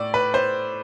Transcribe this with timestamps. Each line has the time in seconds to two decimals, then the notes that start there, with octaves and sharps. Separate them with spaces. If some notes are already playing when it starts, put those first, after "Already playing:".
Already playing: A2 D5
0.14 B4
0.34 C5